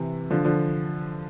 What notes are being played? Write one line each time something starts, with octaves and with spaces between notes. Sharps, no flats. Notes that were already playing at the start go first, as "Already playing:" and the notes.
Already playing: C3 E3
D3 F3
D3 F3